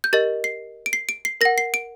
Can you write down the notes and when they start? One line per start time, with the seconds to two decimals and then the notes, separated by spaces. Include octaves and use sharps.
0.04 G6
0.13 G4 A#4 D#5 A6
0.44 C7
0.86 D7
0.93 C7
1.09 D7
1.25 C7
1.41 A#4 F#5 A#6
1.58 C7
1.74 D7